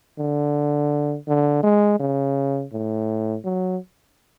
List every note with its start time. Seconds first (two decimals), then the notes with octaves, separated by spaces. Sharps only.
0.19 D3
1.28 D3
1.63 G#3
2.00 C#3
2.72 A2
3.45 F#3